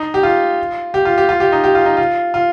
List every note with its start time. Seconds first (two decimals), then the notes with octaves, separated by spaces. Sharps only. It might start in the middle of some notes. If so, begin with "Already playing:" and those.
Already playing: D#4
0.14 G4
0.23 F4
0.94 G4
1.05 F4
1.18 G4
1.29 F4
1.40 G4
1.52 D#4
1.64 G4
1.75 F4
1.86 D#4
1.97 F4
2.34 F4